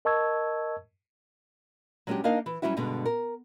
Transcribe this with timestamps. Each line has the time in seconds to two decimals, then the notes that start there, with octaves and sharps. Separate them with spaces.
0.05 A#4 D#5 A5 C#6 E6 G#6
2.07 F#3 G#3 C#4 D4 F#4 G4
2.24 A#3 D4 D#4 A#4 D#5 F5
2.46 E3
2.62 F#3 G3 C4 C#4 E4 F#4
2.77 G2 B2 D3 G#3
3.06 A#4